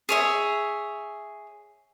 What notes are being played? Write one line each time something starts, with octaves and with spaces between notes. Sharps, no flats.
G#4 C#5 E5